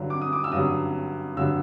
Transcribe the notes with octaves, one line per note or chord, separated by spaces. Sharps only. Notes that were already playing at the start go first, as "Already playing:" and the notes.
Already playing: G2 D3 F#3
D6
D#6
D6
E6
G2 D3 F#3 D#6
G2 D3 F#3 E6